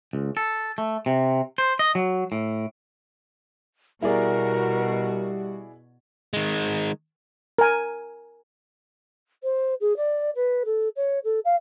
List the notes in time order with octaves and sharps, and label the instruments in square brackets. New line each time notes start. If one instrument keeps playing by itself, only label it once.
[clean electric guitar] C#2
A4
A3
C3
C5
D#5
F#3
A2
[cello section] B2 F#4 [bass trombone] G3 [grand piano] E4 G#4 D5 [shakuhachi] A#4
[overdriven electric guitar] D#3 G#3
[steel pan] A#4 G#5
[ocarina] C5
G#4
D5
B4
A4
C#5
A4
F5